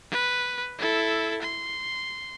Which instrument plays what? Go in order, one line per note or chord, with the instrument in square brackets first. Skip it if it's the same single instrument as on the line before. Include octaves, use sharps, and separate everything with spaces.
[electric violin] B4
E4 A4
C6